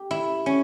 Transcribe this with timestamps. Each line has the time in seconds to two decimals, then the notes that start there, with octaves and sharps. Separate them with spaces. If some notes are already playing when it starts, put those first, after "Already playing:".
Already playing: G4
0.11 E4
0.46 C#4